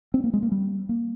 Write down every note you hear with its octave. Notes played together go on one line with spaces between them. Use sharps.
C4
A#3
G#3
A#3
G3
A#3